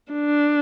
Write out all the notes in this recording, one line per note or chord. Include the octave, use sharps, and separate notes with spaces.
D4